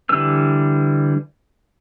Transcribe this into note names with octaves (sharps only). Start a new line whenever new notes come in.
D3 E3 G3 B4 E6